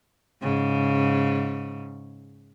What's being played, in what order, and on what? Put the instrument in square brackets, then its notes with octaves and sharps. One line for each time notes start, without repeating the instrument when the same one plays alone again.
[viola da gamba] G#2 C#3